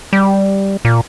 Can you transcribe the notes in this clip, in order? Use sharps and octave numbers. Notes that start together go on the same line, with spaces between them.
G3
A#2